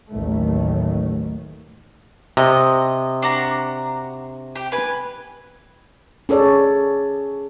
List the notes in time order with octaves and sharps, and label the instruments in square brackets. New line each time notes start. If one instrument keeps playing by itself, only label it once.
[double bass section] A1 D#2 D#3 F#3 A3
[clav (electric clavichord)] C3 [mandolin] D#5
[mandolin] D4 F#4 A#5
G4
B4 G#5
[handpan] C#4 G#4 A4 C#5 D5